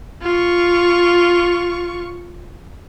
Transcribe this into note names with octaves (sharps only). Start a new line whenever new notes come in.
F4 C#6